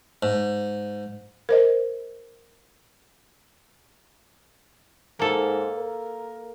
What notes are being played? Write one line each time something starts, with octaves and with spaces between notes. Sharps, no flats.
G#2
A#4 C5 D#5
G#2 A#3 A4
A#4